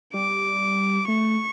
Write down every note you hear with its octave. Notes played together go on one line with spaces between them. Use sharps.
G3 D6
A3 C#6